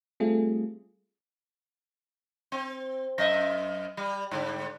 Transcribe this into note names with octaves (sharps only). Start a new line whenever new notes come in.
G3 A3 C4 F4 G#4
C4
F#2 D#5 E5
G3
G#2 D3 G3